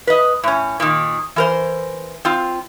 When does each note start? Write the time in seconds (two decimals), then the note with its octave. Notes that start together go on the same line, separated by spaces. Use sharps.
0.07 B4 D#5
0.43 A2 C#4
0.80 A#2 D#3
1.36 E3 A#4 C5
2.25 C4 F4